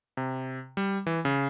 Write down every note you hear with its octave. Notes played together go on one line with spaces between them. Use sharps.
C3
G3
E3
C#3